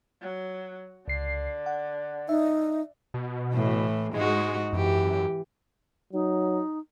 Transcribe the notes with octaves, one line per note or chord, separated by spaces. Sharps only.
F#3
C#2 D3 C7
F#5
D#4 E5
B2
A2 E3
G#2 G#3 D#4 F#4
F#2 E3 G4
F#3 D#4